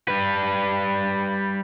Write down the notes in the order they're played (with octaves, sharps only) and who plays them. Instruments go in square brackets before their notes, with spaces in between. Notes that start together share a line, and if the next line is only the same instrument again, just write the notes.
[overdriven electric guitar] G3 B4